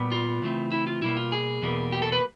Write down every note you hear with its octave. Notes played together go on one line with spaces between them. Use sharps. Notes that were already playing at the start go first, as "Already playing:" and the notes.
Already playing: A#2 G3 B3
F4
C#3 E3 A3 C4
E4
F4
B2 G3 A#3 E4
F4
G#4
E2 B2 G3 A#3
G4
A4
B4